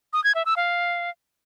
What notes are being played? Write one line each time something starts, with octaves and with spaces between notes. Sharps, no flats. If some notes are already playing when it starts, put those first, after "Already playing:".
D#6
G#6
E5
E6
F5